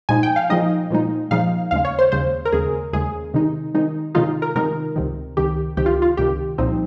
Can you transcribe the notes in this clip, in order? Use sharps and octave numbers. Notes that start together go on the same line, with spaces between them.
A#2 F3 G#3 D#4 G#5
G5
F5
A#2 F3 G#3 D#4 D#5
A#2 F3 G#3 D#4
A#2 F3 G#3 D#4 F5
D#2 C#3 G#3 F5
C#5
C5
D#2 C#3 G#3 C5
A#4
D#2 C#3 G#3 G#4
D#2 C#3 G#3 G#4
C3 D#3 G#3 D#4
C3 D#3 G#3 D#4
C3 D#3 G#3 D#4 F4
A#4
C3 D#3 G#3 D#4 A#4
C#2 C3 D#3
C#2 C3 D#3 G4
C#2 C3 D#3 G4
F4
F4
C#2 C3 D#3 G4
C2 A#2 F3 C4 D#4